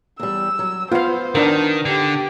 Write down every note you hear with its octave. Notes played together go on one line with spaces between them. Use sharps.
E2 G3 E6
F#3
B3 F4 C5 F5
D#3 D4 A#4
D3 G4